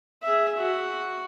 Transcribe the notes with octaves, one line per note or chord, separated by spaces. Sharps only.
G#4 E5
F#4